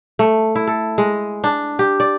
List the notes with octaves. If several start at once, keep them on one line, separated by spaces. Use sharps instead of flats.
A3
E4
A4
G#3
D4
G4
D5